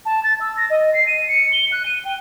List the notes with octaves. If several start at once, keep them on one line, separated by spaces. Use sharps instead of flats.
A5
A6
E6
A#6
D#5
C7
D#7
C#7
G7
F#6
D#7
G5